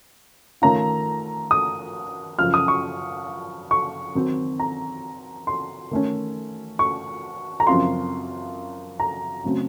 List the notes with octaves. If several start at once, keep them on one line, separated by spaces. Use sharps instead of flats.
D#3 A3 C#4 F4 A#5
D#6
F#2 C#3 F3 F6
D#6
C#6
C#6
D#3 F#3 C4
A#5
C6
D#3 A3 C#4
C#6
A#5
F#2 C#3 F3 C4 F4 C6
A#5
C#3 F#3 A3 C4